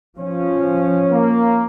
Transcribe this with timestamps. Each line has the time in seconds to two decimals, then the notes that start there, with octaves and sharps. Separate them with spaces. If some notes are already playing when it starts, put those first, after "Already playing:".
0.18 F3 C#4
1.10 A#3